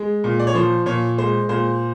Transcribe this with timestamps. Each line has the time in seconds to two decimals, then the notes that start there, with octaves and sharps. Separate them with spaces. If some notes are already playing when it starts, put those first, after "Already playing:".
Already playing: G#3
0.24 A#2
0.40 D5
0.47 C#5
0.55 F3 C5
0.86 A#2 C#5
1.18 G#3 C5
1.49 A#2 C5